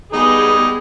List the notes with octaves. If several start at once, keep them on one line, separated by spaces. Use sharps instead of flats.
G3 G#3 B3 D#4 G#4